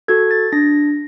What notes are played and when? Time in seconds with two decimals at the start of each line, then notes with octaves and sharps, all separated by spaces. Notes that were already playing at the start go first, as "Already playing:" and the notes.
0.08 F#4 A4 G#6
0.31 A6
0.52 D4 A#6